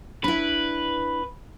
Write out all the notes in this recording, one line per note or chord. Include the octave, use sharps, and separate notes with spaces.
D4 E4 B4